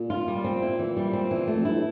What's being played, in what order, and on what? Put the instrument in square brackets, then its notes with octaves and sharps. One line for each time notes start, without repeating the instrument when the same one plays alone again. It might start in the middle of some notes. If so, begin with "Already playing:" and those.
Already playing: [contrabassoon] A#2
[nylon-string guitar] F4
G3
C4
E4
E3
G3
C4
E3
A3
[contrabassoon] F2
[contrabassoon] G2 [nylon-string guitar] E4
[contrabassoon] A2